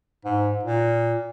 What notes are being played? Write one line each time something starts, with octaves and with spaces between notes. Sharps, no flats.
G#2
A#2